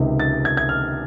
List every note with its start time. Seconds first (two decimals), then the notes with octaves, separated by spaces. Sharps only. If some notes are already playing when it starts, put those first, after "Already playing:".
Already playing: C#2 C3 D#3
0.20 A6
0.45 G#6
0.57 G#6
0.69 F6